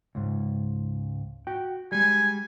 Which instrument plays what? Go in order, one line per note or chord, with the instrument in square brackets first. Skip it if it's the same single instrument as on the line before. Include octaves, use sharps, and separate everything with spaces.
[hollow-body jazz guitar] C#2 G#2
F#4 G5
[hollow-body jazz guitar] G3 G#3 [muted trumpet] G#5